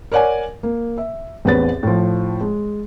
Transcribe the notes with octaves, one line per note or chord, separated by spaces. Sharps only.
A#4 C#5 D5 F#5 G#5
A#3
E5
A1 E2 C4 B4 C#5 A6
A2 F3
G#3